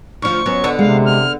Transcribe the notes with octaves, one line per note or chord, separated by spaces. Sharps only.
D2 F3 C#6
F#3 B3 C#4
D3 B3 A4
C3 G#3 F5
F6